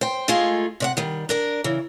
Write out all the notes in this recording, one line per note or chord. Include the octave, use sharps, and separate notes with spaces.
C5 G5
G#3 A3 D#4 F4 G#4
C3 D5 F#5
D#3 G3
D4 A#4 D5
C#3 E3